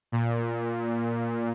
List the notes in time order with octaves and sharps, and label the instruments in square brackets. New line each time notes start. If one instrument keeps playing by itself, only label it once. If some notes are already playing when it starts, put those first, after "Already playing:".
[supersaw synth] A#2